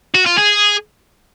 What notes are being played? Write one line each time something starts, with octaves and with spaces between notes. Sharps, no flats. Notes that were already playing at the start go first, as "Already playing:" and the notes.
F#4
F4
G#4